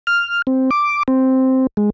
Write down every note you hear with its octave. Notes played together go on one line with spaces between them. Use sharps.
F6
C4
D6
C4
G#3